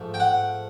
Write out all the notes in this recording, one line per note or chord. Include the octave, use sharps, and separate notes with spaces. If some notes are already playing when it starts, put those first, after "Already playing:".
Already playing: G#2 F3 A3
G5
F#5